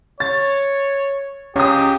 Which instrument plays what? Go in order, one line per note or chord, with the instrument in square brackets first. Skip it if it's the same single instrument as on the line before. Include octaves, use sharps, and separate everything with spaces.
[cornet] C#5 [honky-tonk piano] A6
[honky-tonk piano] C#2 D#6 [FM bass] C#4 [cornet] G4